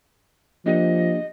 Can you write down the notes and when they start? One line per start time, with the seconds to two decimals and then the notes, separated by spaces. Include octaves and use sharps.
0.66 F3 A#3 D4 G4 D#5